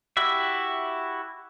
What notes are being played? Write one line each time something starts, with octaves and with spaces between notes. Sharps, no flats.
E4 F#4 G4 E5